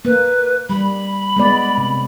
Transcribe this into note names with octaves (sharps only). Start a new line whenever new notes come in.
A#3 B4
G3 B5
G#3 B3 D5
C3